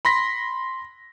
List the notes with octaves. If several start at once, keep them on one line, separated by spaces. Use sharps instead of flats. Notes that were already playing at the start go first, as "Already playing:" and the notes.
B5 C6 A#6 B6